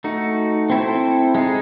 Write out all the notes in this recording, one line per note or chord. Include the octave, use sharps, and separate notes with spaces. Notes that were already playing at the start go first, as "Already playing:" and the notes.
A3 D#4 F#4
C4 E4 A4 C5
G#3 D#4 G#4